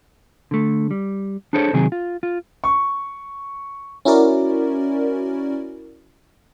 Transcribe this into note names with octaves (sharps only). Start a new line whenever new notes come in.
D3 A3
G3
D4 G#4 A4 C5 C#5
C3 D#3 F#3 C4 G#4
F4
F4
C#6
C#4 E4 F#4 A#4 D5